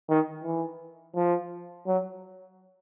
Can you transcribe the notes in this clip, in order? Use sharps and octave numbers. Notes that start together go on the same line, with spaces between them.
D#3
E3
F3
F#3